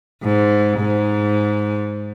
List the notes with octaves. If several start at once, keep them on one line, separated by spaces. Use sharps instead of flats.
G#2
G#2